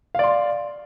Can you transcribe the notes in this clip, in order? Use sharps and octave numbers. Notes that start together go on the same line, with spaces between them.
D5 F5 C6